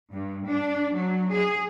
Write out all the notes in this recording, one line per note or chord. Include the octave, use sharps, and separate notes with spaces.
G2
D4
F#3
G#4